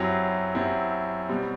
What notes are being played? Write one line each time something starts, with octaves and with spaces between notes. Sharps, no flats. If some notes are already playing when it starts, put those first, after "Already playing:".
Already playing: F#2 F#3 C4 E4 G4
F#2 F#3 C4 E4 G4
B2 G3 C4